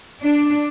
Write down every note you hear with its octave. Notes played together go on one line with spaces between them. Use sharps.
D4